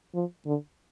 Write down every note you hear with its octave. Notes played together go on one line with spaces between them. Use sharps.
F3
D3